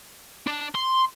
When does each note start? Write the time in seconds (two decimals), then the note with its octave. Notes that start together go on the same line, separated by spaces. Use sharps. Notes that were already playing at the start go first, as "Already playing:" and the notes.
0.47 D4
0.75 C6